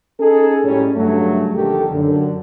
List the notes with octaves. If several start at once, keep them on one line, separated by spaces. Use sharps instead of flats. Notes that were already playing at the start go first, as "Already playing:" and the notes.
C#4 D#4 G#4 A4
A2 G3 C#4
G2 C#3 F#3 A3
A#1 D3 D#3 G4 A4
F#2 D3